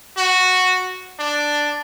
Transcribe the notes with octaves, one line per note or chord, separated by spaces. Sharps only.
F#4
D4